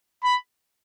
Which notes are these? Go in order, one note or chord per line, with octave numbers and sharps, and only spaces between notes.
B5